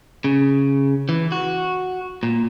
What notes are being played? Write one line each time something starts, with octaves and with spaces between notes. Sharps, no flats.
C#3
E3
F#4
A#2